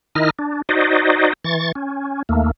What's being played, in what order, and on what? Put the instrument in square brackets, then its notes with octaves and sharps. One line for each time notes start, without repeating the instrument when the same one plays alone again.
[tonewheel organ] D#3 D#4 E4 D#5 F6
D4
D#4 F#4 C5 D5 D#5
E3 C#6 A6
C#4
D#2 A3 A#3